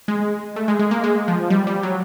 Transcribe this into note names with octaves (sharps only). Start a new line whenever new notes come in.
G#3
A3
G#3
G#3
A#3
G#3
F3
G3
G3
F#3